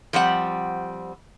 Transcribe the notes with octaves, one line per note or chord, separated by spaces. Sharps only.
F3 G3 C4 F#5